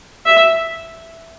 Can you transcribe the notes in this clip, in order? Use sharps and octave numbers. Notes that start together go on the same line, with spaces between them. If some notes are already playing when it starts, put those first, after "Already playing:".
E5